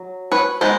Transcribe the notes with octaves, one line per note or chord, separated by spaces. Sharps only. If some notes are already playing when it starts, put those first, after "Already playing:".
Already playing: F#3
B4 C#5
D#3 G#3 B3 C5